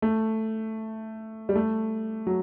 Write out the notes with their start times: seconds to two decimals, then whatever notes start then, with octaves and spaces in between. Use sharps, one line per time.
0.02 A3
1.49 G3
1.56 A3
2.27 F#3